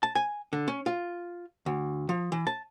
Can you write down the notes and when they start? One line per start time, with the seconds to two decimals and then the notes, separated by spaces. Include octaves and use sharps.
0.03 A5
0.15 G#5
0.53 D3
0.68 C#4
0.86 F4
1.66 D2
2.09 F3
2.32 E3
2.47 A5